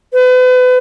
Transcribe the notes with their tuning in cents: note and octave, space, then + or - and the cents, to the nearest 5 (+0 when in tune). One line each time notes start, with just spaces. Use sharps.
B4 +35